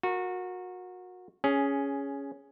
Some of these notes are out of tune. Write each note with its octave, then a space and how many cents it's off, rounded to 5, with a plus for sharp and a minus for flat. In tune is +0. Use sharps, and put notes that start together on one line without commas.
F#4 -25 A#4 +0
C#4 +10 G#4 +0